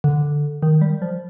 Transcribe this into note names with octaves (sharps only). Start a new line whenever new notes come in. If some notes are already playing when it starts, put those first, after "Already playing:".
D3
D#3
G3
F3